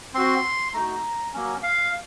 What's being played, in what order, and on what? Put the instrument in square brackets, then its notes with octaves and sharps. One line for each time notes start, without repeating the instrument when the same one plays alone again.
[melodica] C4 F#4 C6
A3 D#4 F#4 A#5
F#3 A#3 C#4
F5